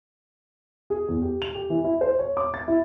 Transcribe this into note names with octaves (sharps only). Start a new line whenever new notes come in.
G#4
E2
G4
F7
G4
E3
E4
C5
C#5
D6
A6
E4